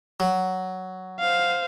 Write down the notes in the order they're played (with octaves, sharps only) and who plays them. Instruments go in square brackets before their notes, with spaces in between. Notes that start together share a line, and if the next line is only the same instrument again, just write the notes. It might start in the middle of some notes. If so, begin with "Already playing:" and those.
[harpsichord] F#3
[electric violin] C5 F5